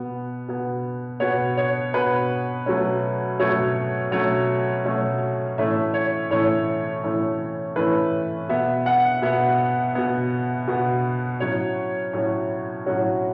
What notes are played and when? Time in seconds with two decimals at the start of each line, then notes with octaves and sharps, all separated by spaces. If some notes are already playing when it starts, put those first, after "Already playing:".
Already playing: B2 B3
0.48 B2 B3
1.20 B2 B3 C#5
1.57 C#5
1.94 B2 B3 B4
2.66 B2 F#3 A3 C#4
3.40 B2 F#3 A3 C#4 C#5
4.11 B2 F#3 A3 C#4 C#5
4.85 B2 F#3 A3 C#4
5.58 A2 E3 A3 C#4 E5
5.94 C#5
6.30 A2 E3 A3 C#4 C#5
7.04 A2 E3 A3 C#4
7.76 A2 E3 A3 C#4 B4
8.49 B2 B3 E5
8.86 F#5
9.22 B2 B3 E5
9.95 B2 B3
10.68 B2 B3
11.40 A2 F#3 C#4 C#5
12.13 A2 F#3 C#4
12.86 A2 F#3 C#4 F#4